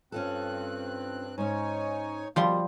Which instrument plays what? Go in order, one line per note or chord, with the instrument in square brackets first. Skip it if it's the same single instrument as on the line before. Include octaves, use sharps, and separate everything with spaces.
[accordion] G2 C4 F#6 [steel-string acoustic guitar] C#4 F4 A4
[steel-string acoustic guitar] G#2 C#4 [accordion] D#4 C#5 G#5
[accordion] B2 A#3 [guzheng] F3 G3 C6